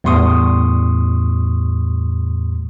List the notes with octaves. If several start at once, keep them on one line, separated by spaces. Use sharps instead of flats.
E2 A2 G3 C6 C#6 D#6